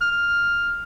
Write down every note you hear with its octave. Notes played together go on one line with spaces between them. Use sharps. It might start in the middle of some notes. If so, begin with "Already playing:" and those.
F6